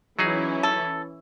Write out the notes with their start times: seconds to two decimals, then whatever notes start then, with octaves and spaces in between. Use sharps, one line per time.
0.19 E3 F#3 C#4 D#4 E4 G#4
0.63 A4